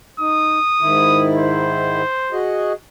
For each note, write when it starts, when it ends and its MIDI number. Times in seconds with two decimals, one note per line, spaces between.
0.20 0.59 63
0.20 1.30 87
0.81 2.02 44
0.81 2.02 51
0.81 2.02 64
1.37 2.39 72
2.32 2.72 66
2.32 2.72 68
2.32 2.72 75